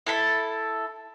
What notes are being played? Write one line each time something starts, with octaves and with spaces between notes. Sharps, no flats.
E4 A4 B5